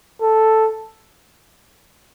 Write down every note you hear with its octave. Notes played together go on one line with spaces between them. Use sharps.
A4